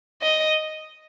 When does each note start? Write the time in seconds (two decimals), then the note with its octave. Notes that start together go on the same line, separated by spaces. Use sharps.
0.23 D#5